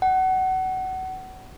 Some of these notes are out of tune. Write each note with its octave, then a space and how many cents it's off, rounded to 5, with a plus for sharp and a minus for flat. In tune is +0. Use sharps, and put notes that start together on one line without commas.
F#5 +25